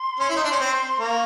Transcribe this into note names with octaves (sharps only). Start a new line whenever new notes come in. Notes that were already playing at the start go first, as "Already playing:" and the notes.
Already playing: C6
C#4
E4
D#4
D4
C#4
C4
A#3 C#6